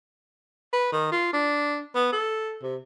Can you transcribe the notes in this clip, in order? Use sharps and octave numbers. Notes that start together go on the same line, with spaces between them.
B4
D#3
F4
D4
B3
A4
C3